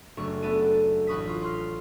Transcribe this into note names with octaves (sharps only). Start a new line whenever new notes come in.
F#1 A3 D4 C#6
A3 B3 D4 A4 D#7
A1 B4 C#6 D#6 B6
F4
C6 F6 C7